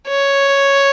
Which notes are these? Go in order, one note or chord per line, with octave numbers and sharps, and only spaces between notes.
C#5